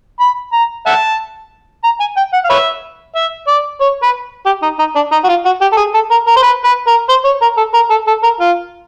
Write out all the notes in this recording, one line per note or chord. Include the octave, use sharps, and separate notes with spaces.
B5
A#5
E5 F#5 A5
A#5
G#5
G5
F#5
F5
B4 C#5 E5
E5
D5
C#5
B4
G4
D#4
D#4
D4
D#4
F#4
F4
F#4
G4
A4
G#4
A4
A#4
A#4
C5
B4
B4
A#4
C5
C#5
A#4
A4
A#4
A4
A4
A#4
F4